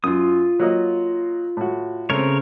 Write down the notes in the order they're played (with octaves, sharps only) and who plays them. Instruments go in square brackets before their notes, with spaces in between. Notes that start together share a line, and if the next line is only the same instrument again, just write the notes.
[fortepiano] F#2 [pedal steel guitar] F4 D#6
[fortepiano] F#3 A#3 D#5
A2 F#4
[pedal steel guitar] C#3 A#4 C#5 [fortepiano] A3 C4